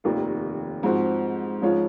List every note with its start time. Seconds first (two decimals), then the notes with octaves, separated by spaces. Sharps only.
0.04 F1 D#2 D#3 A#3 F4
0.83 G#2 F3 C4 F#4
1.62 G#2 F3 G#3 C#4 F4